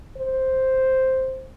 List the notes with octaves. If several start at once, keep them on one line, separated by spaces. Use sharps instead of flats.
C5